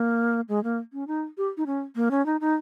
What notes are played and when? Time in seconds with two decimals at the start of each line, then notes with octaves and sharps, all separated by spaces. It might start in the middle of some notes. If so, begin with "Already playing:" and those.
Already playing: A#3
0.49 G#3
0.64 A#3
0.93 C#4
1.08 D#4
1.38 G4
1.57 D#4
1.66 C#4
1.96 A#3
2.11 C#4
2.26 D#4
2.41 D#4